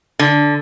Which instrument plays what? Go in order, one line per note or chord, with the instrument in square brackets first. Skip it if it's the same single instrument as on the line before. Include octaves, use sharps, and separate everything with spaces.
[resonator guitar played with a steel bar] D3